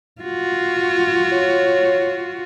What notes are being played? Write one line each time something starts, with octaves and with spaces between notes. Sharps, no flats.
F4 F#4
C#5